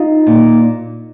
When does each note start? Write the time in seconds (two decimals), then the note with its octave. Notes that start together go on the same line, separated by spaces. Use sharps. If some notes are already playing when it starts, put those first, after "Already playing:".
Already playing: D#4 F4
0.27 A#2